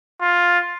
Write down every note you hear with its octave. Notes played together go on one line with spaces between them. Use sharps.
F4